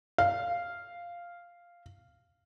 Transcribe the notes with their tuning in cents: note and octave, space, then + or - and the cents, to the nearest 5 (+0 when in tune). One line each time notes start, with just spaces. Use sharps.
F5 -5